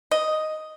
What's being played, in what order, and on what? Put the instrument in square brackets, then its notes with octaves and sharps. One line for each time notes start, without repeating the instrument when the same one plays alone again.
[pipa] D#5